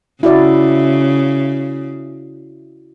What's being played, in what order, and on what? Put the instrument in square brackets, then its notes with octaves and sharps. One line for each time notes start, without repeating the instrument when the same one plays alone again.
[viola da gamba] C#3 [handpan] E4 F#4 D5